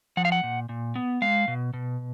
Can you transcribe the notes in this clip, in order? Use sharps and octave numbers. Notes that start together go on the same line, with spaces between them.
F3 F#5
F5
F#5
A#2
A#2
B3
G#3 F5
B2
B2